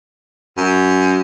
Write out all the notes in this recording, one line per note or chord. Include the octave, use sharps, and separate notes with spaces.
F#2